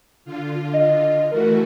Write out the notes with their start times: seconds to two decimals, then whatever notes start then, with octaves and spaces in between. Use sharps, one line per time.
0.25 D3 F4
0.73 D#5
1.31 E3 A3 F#4 A#4